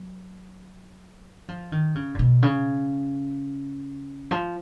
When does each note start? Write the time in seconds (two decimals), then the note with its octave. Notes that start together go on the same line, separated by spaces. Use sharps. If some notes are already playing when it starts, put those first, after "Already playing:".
Already playing: F#3
1.49 F3
1.72 D#3
1.95 C#3
2.15 A#2
2.19 B2
2.42 C#3
4.31 F3